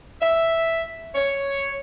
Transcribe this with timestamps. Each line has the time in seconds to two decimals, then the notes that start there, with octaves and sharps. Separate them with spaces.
0.21 E5
1.16 C#5